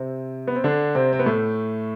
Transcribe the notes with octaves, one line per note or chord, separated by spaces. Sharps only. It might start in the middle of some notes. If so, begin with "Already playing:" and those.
Already playing: C3 C4
B3
C4
D3 D4
C3 C4
C4
B3
A2 A3